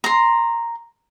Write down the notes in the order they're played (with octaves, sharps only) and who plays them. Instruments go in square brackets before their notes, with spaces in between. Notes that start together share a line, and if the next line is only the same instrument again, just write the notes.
[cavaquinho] A#5 C6